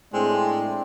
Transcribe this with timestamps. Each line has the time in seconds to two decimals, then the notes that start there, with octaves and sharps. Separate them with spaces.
0.13 A2 G#3 C4 D4